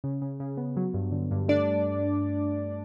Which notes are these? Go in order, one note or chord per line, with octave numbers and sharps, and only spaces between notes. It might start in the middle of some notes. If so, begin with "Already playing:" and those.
C#3
C#3
C#3
B3
F#3
G2
D3
G2
A3 D4 D5